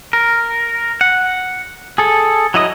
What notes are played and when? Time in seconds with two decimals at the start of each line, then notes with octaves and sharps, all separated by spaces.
0.13 A#4
1.01 F#5
1.98 G#4 A4
2.54 F#3 E4 D#5 D#6